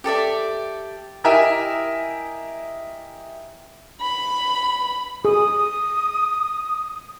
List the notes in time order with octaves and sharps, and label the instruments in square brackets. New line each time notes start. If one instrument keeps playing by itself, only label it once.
[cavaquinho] G4 A4 D5 E5
[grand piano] E4 G4 A#4 D#5 E5 G#5
[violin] B5
[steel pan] G#4 [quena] D#6